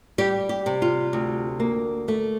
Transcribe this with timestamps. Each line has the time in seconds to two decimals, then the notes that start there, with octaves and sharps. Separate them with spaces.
0.18 G3 G4
0.49 G4
0.66 C3
0.82 F4
1.13 D2
1.60 A#3
2.08 A3